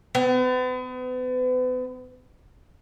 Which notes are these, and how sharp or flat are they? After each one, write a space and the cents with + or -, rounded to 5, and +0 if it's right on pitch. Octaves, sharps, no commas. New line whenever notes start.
B3 +40